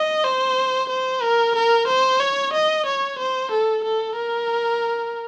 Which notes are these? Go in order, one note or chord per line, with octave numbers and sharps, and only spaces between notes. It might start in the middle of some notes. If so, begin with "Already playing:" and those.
Already playing: D#5
C5
C5
A#4
A#4
C5
C#5
D#5
C#5
C5
A4
A4
A#4